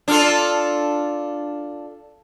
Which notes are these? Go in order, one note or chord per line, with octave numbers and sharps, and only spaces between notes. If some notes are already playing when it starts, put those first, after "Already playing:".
D4 F4 A4